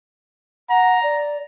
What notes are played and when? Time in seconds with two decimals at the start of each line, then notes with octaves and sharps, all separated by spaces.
0.70 F#5 A#5
1.03 D5